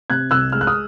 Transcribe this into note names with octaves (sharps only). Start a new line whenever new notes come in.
C3 F#6 G#6
C2 E6 F#6
G#3 F6
F#6
D#6 F6